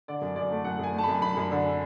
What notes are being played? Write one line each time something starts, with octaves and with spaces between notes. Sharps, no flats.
D3 D5
F#2
F#2 D5
A3
F#2 F#5
F#2 G#5
A3
A5
B5
F#2
F#2 B5
F#2
D3